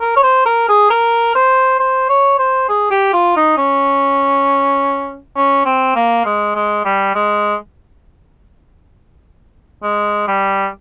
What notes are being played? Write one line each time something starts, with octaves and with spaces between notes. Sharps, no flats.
A#4
C#5
C5
A#4
G#4
A#4
C5
C5
C#5
C5
G#4
G4
F4
D#4
C#4
C#4
C4
A#3
G#3
G#3
G3
G#3
G#3
G3